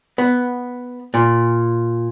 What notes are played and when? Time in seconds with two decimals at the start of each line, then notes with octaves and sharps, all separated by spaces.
0.18 B3
1.14 A#2